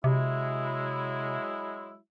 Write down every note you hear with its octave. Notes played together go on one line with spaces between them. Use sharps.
C3 F#3 G#3 E4